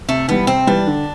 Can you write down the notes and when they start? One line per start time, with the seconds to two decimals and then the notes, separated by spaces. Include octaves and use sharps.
0.08 C3 A3
0.28 E3 G3 B3
0.47 C3 C4
0.67 E3 G3 D4
0.87 D3